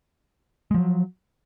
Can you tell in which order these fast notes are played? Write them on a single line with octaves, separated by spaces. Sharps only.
G#3 F3 F#3